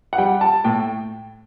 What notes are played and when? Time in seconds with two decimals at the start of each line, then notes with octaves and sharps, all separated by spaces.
0.13 F#5
0.18 G3 G5
0.41 A5
0.64 A2 G5